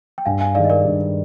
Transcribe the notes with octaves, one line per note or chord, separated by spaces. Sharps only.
G5
G2 F5 G#5
F5 G#5
D#3 G#3 D#4 D5 F5
D#5
A#4 D5
G2